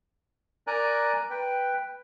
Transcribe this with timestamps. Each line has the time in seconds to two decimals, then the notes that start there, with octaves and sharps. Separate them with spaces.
0.67 A#4 D5 G#5 A#5 F#6
1.30 B4 G5